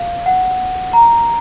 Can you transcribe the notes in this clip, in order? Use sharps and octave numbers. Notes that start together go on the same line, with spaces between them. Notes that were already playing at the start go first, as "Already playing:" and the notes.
Already playing: F5
F#5
A#5